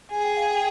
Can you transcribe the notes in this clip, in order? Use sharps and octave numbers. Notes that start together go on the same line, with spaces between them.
G#4 G#5
G5
F5
G5